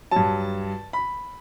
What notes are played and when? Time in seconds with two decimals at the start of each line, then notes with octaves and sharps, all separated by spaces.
0.11 G2 F#3 A5
0.93 B5